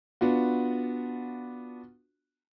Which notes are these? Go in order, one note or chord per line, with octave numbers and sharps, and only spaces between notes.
B3 D4 F4 F#4